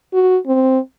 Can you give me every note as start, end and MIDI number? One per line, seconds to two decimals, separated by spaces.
0.14 0.37 66
0.47 0.79 60